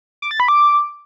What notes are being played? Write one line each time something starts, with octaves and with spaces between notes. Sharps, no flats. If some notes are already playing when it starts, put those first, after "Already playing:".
D6
A6
B5
D6